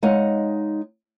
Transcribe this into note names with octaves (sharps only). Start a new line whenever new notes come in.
G#3 D#4 C#5 F5 F#5